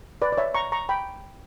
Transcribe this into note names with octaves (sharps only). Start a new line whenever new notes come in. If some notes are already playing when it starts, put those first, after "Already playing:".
B4 D5
D5
C#5 E5
A#5 C#6
A#5 C#6
G5 B5